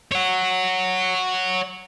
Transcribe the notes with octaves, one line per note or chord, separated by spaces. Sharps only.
C#5 F#5